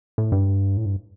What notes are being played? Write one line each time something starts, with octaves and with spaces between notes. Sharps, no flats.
A2
G2
A2
G2